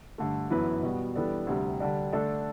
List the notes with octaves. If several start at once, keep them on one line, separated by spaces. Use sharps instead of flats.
G2 D3 A3
F#2 E3 B3 E4 B4
B2 G3 B3 F#4
E3 G3 B3 D4 A4
D2 C3 G3
D3 G3 D4
D3 A3 D4 A4